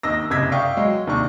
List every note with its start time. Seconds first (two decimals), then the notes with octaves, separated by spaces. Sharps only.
0.03 D#2 D#5 E6 A#6
0.30 F#1 C3 D#5 E6 G#6 B6
0.51 D5 F5 G5 C#6 D#6
0.76 F#3 G#3
1.07 D#2 C3 D4 C#6